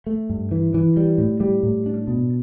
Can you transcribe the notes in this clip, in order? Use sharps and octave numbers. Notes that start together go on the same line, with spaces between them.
A3
G2
E3
E3
G3
A2
G3
A2
D4
B2